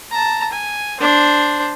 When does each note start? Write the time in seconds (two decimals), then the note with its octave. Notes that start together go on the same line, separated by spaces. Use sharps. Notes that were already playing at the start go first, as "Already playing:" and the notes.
0.11 A5 A#5
0.52 G#5
1.00 D4 C5